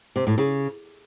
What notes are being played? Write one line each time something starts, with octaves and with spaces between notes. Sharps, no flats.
C3
A2
C#3